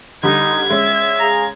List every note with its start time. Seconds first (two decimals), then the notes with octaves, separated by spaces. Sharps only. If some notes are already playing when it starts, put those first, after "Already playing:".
0.23 D3 G3 D#4 G#6
0.70 G#3 C#4 E5
1.20 G#4 F5 A#5